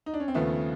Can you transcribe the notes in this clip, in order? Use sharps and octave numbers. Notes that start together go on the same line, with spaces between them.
D#4
D4
C#4
C4
D#2 C#3 F3 A3 B3